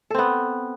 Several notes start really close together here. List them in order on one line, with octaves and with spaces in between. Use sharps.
A4 C4 B3